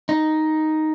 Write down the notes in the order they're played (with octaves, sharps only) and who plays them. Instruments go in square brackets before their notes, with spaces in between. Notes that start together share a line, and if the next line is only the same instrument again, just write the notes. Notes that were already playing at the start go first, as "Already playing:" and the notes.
[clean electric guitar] D#4